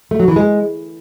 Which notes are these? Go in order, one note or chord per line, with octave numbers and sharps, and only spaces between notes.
A3
F#3
E3
G#3